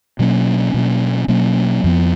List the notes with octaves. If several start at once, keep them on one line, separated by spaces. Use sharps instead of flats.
B2 F#3 A#3 C#4
B2 F#3 A#3 C#4
B2 F#3 A#3 C#4
F2 F3 B3